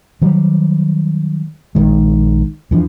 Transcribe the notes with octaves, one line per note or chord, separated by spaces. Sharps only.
D#3 F#3 G3
A#1 D#3 G#3
E2 E3 F3 D4